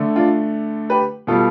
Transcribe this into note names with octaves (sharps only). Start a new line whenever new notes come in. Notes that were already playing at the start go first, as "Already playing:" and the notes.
Already playing: D3 A3
D4 F4
G4 B4
B2 G3 F4 A4